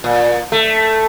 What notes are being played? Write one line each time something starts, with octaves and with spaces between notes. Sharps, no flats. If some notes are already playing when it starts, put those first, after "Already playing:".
A#2
A3